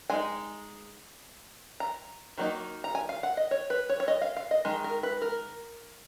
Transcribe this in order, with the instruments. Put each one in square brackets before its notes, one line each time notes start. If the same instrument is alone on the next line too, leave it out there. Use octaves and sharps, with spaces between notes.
[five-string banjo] G#3 D#4 G#5
A#5
D#3 F#3 A#3 D#4
A#5
G#5
F5
F#5
D#5
C#5
B4
C#5
C#5
D#5
F5
F5
D#5
D#3 G#3
A#4
B4
A#4